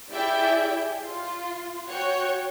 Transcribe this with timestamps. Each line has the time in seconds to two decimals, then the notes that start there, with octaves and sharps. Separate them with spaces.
0.12 E4 G4 G#4 D5 E5 G5
1.02 F4
1.89 F#4 C#5 G5